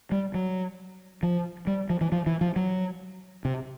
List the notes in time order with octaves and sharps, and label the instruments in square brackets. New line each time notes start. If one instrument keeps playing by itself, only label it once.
[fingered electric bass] G3
F#3
F3
G3
F3
E3
F3
E3
F3
F#3
C3